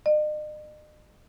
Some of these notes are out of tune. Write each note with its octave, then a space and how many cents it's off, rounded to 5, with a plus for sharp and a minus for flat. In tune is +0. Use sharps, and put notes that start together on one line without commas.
D#5 -45